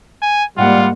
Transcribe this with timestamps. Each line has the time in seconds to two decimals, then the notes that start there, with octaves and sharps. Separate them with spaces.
0.22 G#5
0.58 G#2 G3 A#3 F4 F#5